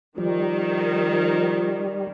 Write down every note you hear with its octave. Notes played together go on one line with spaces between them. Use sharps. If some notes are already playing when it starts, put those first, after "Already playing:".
D#3 F3 G3